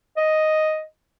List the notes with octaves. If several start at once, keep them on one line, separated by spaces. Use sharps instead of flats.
D#5